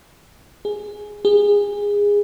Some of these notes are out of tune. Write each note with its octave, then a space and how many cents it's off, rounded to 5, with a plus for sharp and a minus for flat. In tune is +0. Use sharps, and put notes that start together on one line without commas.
G#4 +5
G#4 -20